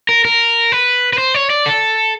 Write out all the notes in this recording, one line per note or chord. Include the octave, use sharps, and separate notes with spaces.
A#4
A#4
B4
B4
C5
C#5
D5
A4